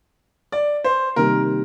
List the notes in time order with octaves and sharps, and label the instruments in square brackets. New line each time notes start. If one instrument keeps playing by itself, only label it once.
[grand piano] D5
C5
[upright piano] C3 D#3 G3 A#3 D#4 [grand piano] A#4